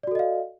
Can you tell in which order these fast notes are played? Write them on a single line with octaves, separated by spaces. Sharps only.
D5 F#4 A4 D#5 F5